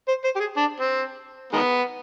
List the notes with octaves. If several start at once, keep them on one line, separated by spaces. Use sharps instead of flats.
C5
C5
G4
G#4
D4
C4
D#3 G#3 B3